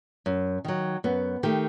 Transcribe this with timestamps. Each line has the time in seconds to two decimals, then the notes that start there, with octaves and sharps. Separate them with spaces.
0.26 F#2
0.64 D#3 F#3
1.04 F#2 B3
1.43 D#3 A3 G4